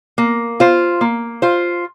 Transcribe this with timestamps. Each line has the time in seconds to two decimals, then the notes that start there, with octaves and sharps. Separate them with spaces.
0.18 A#3
0.60 F4 C5
1.01 A#3
1.42 F4 C5